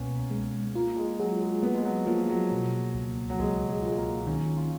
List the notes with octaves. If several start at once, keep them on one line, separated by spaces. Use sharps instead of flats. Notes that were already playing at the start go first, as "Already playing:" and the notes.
Already playing: C#2 B2 A#3 B3 C#4
G#3
A#3 F4
G#3
F#3 G#4
G#3
A#3 B3
G#3
F#3
F3 A#3
F#3
B2
C#2
F#3
C#2 G#3
G#3
F4
G#3
A#3
D#3 C#4
F4